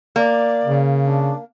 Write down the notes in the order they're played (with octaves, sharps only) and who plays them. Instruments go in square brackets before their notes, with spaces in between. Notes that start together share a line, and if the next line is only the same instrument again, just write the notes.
[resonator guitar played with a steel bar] A#3 [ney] D5
[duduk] C#3
[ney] D4